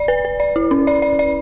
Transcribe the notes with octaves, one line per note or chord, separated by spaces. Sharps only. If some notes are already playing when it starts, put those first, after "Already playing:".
Already playing: D5
B4
B4
D5
E4
C#4
D5
D5
D5